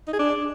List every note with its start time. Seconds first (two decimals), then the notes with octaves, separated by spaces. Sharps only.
0.07 D#4
0.13 G#4
0.19 D4